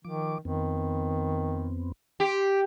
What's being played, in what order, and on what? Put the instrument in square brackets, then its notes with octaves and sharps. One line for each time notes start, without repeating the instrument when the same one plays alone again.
[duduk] D#3 [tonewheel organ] F3 D6
[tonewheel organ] F2 B3 C4 [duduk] D#3
[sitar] G4 [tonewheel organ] C6